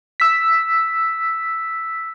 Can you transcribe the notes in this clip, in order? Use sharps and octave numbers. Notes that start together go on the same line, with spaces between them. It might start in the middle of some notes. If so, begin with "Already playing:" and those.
E6 B6